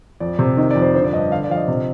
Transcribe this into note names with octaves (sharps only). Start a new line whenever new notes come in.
F2 D5
C3
D#3 D#5
D5
F2
C5
D3 C5
D5
G2 D#5
D3 F5
D5
F3 F5
D#5
C3